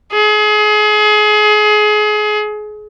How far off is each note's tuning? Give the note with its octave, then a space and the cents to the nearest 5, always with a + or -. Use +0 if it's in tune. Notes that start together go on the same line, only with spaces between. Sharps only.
G#4 +30